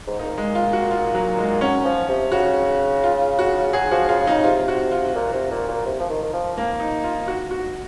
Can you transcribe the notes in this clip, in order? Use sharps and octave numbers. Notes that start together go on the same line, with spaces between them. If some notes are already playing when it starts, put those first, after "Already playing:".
G#2
A#2 D#4
G#3
F4
F#4
F4
F#3
G#3
F#3 C#4
F3
C3
C#3 F#4
F4
F#4
F#3 G#4
F3 F#4
C#3 F4
C#3 D#4
C3 F4
F#4
F4
A#2
C3
A#2
A#2
C3
F3
D#3
D#3
F3
A#3
D#4
F4
F#4
F#4